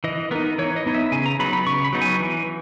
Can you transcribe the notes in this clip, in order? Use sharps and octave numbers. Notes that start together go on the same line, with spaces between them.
E3 D#5
B3 D#4 A#4
E3 C#5
D#5
B3 D#4
E5
C#3 G#5
A#5
F#3 B3 D#4 B5
B5
C#3 C#6
B5
F#3 B3 D#4
G#5
E3